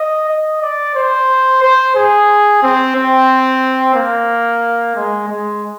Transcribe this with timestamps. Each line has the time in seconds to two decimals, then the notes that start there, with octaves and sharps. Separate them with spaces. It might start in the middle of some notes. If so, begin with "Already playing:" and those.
Already playing: D#5
0.30 D#5
0.62 D5
0.95 C5
1.62 C5
1.96 G#4
2.62 C4
2.96 C4
3.95 A#3
4.96 G#3
5.28 G#3